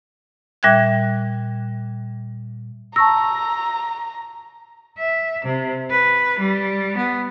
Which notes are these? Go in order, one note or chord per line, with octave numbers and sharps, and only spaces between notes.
A#2 G3 E5 G5 F#6 G#6
A5 A#5 C#6 E6 A#6
E5
C3
B4
G3
B3